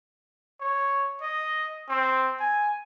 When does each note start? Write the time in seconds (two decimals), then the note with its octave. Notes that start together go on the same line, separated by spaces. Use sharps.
0.61 C#5
1.21 D#5
1.89 C4
2.40 G#5